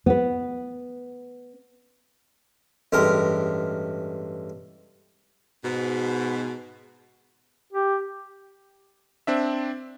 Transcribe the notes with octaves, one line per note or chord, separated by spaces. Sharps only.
B3 B4
A1 G2 G#3 A#4
G#2 B2
G4
C4 D4 E5